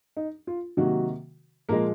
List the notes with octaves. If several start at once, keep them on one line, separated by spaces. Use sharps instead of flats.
D#4
F4
C3 D#3 F#3 A#3 F#4
A#2 F3 G#3 A#3 A#4